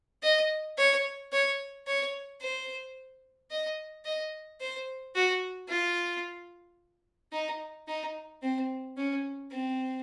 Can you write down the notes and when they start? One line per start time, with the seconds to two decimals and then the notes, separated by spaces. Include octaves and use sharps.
0.23 D#5
0.78 C#5
1.32 C#5
1.87 C#5
2.41 C5
3.51 D#5
4.05 D#5
4.61 C5
5.15 F#4
5.69 F4
7.32 D#4
7.88 D#4
8.42 C4
8.97 C#4
9.51 C4